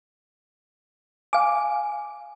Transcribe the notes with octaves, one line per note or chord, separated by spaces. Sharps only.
F5 G#5 D6